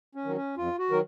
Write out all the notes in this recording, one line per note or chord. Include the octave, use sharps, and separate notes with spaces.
C#4
D#3 F#3
C#4
F2 F4
F#4
D#3 F#3 A#4